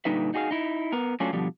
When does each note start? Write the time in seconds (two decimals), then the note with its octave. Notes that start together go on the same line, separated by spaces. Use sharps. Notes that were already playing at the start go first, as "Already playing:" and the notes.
0.05 A#2 D3 G3 D#4 B4 E5
0.34 D#4 F#4 G#4 D5 F5
0.51 D#4 E4
0.92 B3 A#4
1.20 F#3 A3 C#4 D4 F4
1.33 B2 D3 F3 G3